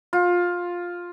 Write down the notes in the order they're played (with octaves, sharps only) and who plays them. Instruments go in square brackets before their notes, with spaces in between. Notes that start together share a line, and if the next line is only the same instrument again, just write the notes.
[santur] F4